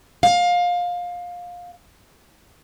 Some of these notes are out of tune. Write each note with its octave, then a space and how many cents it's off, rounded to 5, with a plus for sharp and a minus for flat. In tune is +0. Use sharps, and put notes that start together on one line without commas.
F5 +20